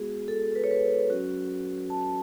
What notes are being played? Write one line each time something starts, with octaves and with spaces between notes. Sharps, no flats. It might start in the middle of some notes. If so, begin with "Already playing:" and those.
Already playing: G#3 B3 F#4 G#4
A4
B4
C#5
B4
F#3 C#4 F#4
A5